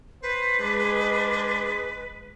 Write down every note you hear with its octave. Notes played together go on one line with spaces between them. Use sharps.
B4 C5
G#3 D4